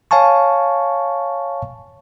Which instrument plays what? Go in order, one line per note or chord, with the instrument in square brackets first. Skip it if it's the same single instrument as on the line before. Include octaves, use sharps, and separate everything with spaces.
[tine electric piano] C#5 F5 G#5 A5 C#6